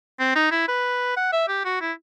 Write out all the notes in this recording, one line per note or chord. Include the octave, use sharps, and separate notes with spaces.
C4
D#4
E4
B4
F#5
E5
G4
F#4
E4